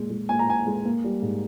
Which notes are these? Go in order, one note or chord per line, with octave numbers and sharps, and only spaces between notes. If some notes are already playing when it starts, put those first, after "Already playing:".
Already playing: A#2 G#3
G#3
A#2 G#5
A#5
A#2 G#5
G#3
A#3
G3
G#2